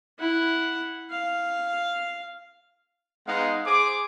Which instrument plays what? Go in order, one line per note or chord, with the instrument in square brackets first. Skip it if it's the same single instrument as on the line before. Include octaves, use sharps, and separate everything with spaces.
[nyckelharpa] E4 F#5
F5
[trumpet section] G#3 B3 D#4 F5 F#5
G#4 C5 D6